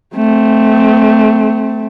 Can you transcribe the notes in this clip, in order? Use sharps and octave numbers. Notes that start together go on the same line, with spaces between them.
A3 C4